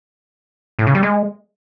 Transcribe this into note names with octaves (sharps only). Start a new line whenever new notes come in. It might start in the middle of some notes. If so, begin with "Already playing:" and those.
A2
C#3
G3
G#3